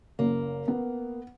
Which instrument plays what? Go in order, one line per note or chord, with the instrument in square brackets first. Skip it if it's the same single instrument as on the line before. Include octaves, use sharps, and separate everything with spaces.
[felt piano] F#1 [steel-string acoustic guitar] A#3
[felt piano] B3